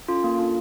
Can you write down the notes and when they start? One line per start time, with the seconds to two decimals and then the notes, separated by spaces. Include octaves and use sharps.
0.08 C#4 F4 A4
0.24 A#3
0.38 D4 F4 A4